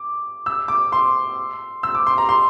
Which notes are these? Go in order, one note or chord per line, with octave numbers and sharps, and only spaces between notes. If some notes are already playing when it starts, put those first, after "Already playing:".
Already playing: D6
E6
D6
C6
E6
D6
C6
A#5
C6